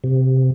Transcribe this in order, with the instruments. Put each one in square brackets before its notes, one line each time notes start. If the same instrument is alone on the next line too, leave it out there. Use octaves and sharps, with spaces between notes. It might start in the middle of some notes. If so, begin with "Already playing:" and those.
[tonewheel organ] C3